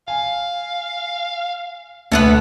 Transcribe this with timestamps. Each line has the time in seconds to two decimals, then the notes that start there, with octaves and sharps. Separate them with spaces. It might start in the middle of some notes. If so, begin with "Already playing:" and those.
0.08 F5 G#5
2.12 D2 A3 B3 B4